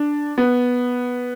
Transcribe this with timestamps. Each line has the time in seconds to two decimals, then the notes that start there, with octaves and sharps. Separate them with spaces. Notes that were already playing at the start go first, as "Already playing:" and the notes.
Already playing: D4
0.38 B3